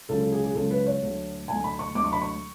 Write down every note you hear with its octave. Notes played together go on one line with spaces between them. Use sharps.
C#2 C#3 F#3 A4
A4
G#4
G#4
C#2 C#3 F#3 A4
B4
C#5
D2 D3 F#3
D2 D3 F#3 G#5
B5
C#6
D2 D3 F#3 D6
C#6
B5
C#6